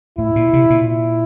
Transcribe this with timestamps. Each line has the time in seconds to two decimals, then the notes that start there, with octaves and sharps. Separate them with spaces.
0.18 A2 E4
0.36 A#2
0.53 C3
0.70 A#2
0.88 E4